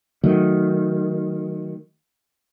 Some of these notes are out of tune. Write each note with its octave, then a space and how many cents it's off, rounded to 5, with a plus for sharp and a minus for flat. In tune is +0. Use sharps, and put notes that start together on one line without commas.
D#3 +0 F#3 +0 A3 +0